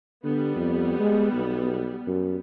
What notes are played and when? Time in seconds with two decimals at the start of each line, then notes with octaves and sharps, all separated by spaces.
0.24 D3 G3 B3
0.56 F2
0.99 G#3
1.33 B1
2.07 F#2